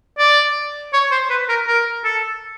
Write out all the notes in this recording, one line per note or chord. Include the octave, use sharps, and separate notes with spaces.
D5
C#5
C5
B4
A#4
A#4
A4